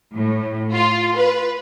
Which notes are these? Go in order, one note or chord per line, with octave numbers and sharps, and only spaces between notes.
A2
F4
B4